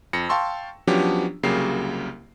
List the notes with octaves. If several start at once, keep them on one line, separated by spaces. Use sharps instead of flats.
F2 A#6 C#7
F5 G5 A5 C6 C#6 E6
F3 F#3 B3 C#4 D4 G4
C2 C#3 F#3 A#3 G4 C7